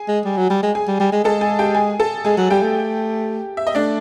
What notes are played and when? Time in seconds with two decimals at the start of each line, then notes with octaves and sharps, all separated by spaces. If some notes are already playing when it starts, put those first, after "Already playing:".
Already playing: G#4 G#5
0.08 G#3
0.25 G3
0.37 F#3
0.50 G3
0.63 G#3
0.75 G#4 G#5
0.88 G3
1.00 G3
1.12 G#3
1.25 G#3 A4 A5
1.41 G#4 G#5
1.59 G4 G5
1.75 G#4 G#5
2.00 A4 A5
2.25 G#3 G#4 G#5
2.38 F#3
2.50 G3 G4 G5
2.63 A3
3.57 E5
3.67 D#5
3.75 A3 D4 D5